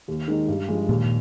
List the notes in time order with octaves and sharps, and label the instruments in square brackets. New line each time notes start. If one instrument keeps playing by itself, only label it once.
[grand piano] D#2
D#3 G#3 D#4
G2
F3 G#3
[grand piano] D#2 [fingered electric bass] A#2